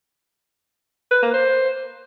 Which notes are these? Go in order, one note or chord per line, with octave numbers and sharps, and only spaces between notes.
B4
A#3
C5